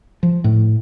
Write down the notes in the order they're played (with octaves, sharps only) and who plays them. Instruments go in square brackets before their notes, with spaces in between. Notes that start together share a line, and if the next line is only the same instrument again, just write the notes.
[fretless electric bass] F3
A2